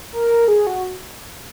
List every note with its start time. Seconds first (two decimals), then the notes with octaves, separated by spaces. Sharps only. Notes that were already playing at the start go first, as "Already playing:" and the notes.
0.13 A#4
0.48 G#4
0.67 F#4